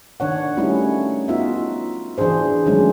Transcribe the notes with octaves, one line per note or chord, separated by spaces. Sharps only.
D#3 D4 C#5 F#5
G3 A3 C#4 D#4 E4 F#4
B3 D#4 F4 F#4 E5
E3 D4 F#4 G#4 C5
D#3 F#3 G#3 A3 C#4 D4